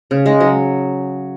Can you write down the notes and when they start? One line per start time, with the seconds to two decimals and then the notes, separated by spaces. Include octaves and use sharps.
0.11 C#3
0.26 G#3
0.40 F#3